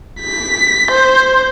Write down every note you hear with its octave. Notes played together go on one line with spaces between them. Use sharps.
B6
C5